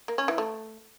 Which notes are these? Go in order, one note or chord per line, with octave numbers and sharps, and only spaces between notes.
A#3
C#4
E3
A3